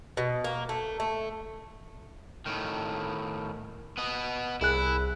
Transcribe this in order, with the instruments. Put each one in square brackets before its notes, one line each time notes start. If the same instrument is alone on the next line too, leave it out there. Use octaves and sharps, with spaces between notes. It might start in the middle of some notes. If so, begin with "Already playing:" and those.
[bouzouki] B2
A#3
A3
A3
[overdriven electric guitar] A2 D#3
B3 D#5
[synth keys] C2 G#4 F#6 [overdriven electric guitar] E4